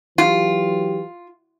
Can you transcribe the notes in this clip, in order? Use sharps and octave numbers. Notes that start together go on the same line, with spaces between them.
E3 F#3 F4 G4